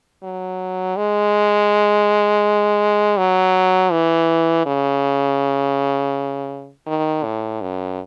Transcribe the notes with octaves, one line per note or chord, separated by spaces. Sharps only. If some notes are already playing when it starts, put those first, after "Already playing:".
F#3
G#3
F#3
E3
C#3
D#3
A2
F#2